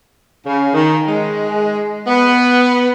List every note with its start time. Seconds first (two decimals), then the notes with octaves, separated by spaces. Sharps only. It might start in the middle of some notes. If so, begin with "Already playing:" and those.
0.46 C#3
0.73 D#3
1.08 G#3
2.07 B3